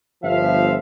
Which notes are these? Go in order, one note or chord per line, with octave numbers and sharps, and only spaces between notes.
G1 F3 E5 F5